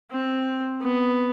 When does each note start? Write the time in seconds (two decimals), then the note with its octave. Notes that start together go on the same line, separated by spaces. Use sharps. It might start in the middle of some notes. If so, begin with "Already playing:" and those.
0.12 C4
0.82 B3